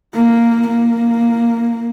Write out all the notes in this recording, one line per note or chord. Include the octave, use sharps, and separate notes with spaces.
A#3
A#3